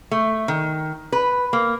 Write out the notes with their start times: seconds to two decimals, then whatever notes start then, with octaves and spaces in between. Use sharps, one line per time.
0.11 A3
0.48 D#3
1.12 B4
1.53 A#3